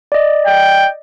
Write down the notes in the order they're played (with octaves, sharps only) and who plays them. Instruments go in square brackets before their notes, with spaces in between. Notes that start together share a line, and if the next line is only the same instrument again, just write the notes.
[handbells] D5 D#5
[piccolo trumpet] G5